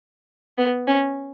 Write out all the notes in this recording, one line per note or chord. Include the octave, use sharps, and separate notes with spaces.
B3
C#4